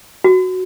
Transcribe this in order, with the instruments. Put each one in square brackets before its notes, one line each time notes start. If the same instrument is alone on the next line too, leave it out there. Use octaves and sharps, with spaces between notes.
[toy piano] F#4